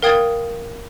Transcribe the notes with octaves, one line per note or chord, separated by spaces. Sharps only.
A#4 F5 G5 D#6 G#6 A6